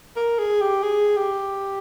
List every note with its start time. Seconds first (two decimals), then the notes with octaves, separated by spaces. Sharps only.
0.16 A#4
0.39 G#4
0.62 G4
0.83 G#4
1.17 G4